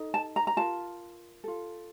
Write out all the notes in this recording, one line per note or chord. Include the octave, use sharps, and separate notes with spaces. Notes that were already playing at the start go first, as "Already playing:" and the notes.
Already playing: D#4 A4
A5
A#5
A#5
F4 A#4 A5
F4 A4